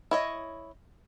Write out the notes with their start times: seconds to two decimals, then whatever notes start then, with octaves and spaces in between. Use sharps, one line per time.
0.11 E4 C#5 D#5